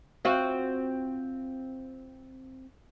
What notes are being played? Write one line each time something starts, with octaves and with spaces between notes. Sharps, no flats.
C4 F4 F#4